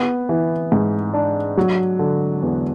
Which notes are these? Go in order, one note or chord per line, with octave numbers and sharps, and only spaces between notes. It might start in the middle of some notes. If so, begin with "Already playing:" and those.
Already playing: B3
E3
G#2
D4
F#3
D3
E2